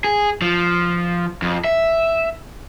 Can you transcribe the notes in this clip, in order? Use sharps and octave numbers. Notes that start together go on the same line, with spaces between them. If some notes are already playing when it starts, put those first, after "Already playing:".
G#4
F3
F2
E5